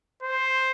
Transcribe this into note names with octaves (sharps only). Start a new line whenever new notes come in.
C5